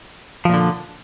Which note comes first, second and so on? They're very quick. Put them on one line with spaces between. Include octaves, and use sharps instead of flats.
F3 A#2 D3